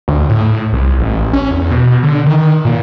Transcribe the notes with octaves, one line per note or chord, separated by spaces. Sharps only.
D2
A2
C2
A1
C#4
E2
B2
D3
D#3
A#2